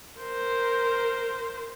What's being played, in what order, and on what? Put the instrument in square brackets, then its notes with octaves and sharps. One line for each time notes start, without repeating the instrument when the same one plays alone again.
[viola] A#4 C5